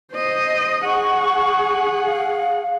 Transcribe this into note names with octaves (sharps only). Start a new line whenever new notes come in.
C5 D#5
G#4 F#5 C#6
F5